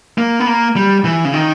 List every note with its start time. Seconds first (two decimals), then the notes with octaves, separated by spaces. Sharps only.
0.18 A#3
0.40 B3
0.47 A#3
0.76 G3
1.05 E3
1.25 C#3
1.34 D#3